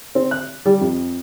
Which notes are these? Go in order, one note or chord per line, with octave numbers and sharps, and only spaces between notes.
C4
F#6
G3
F2